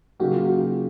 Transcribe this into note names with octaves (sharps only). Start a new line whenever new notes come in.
C#3 F#3 A#3 D#4 F#4 G4
F4
F#4